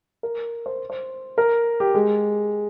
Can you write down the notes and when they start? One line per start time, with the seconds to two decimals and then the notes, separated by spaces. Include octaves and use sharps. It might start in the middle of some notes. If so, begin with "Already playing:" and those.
0.23 A#4
0.66 C5
0.90 C5
1.38 A#4
1.80 G4
1.94 G#3